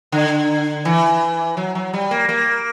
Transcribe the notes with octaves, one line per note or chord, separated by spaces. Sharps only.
D3
E3
F#3
F#3
G3
A#3
A#3